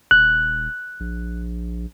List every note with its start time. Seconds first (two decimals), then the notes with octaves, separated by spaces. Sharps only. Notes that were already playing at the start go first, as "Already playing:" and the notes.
0.11 D#1 F#6
1.00 A#1